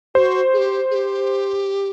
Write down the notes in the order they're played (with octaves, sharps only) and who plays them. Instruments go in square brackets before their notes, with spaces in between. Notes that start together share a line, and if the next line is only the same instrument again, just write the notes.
[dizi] F#4 G4 [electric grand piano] C5
[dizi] G#4
G4
G#4
G4